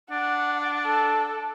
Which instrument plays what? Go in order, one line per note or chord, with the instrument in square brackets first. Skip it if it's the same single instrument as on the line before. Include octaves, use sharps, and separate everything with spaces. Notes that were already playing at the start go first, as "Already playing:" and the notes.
[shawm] D4 [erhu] F#5
[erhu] A4